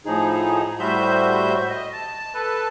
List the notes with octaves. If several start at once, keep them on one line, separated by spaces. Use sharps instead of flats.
A2 F3 D#4 G#4
A2 G3 F#4 C5 E5 G6
D#5
A5
A4 B4 A5